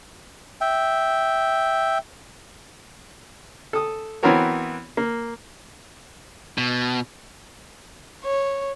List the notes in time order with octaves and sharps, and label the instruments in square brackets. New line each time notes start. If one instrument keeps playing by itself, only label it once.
[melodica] E5 G5
[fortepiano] A4 D#6
E3 B3 C4 F#4 A#4 C#5
A#3
[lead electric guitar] B2
[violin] C#5